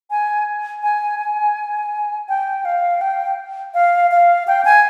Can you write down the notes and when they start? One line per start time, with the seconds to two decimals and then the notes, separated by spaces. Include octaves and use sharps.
0.11 G#5
0.83 G#5
1.19 G#5
2.29 G5
2.65 F5
3.01 G5
3.74 F5
4.11 F5
4.47 G5
4.65 G#5